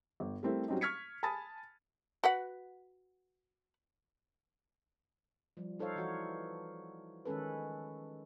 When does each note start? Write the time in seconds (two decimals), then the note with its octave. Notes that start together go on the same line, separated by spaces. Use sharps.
0.20 G1
0.43 G3 A3 C4 E4 A#4
0.68 F#3 G3 C4 C#4 D#4
0.81 C#6 F6 G#6 B6 C#7
1.23 G#5 A5 B5 D#6 A6
2.24 F#4 B4 F#5
5.57 F3 G3
5.79 D#4 A4 C5 C#5 F5
5.96 E3 F#4 C#5
7.25 D#3 G#3 C#4 A4 B4